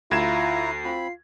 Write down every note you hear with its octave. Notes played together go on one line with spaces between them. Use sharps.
D2 E4 F4 A#5 G#6 C7 E7
C4 F4 B5